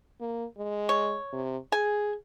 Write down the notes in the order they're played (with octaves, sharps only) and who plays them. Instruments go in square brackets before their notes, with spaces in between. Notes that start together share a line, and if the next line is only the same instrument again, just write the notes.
[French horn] A#3
G#3
[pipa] C#5
[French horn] C3
[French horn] G#4 [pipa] G#5